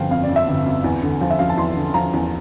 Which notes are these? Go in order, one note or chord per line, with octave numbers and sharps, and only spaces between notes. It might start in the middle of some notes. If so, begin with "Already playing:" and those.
Already playing: G1 D3 F3 F5 G5
F2 F5
D5
F2
E5
G1
F2
E2
D3
F3
E5
F3 F5
A5
E2 C6
D3
F3 A#5
E2